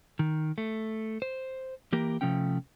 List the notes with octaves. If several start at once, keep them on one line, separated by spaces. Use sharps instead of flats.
D#3
A3
C5
E3 A#3 G4 A#4
C3 F3 A3 C#4 G5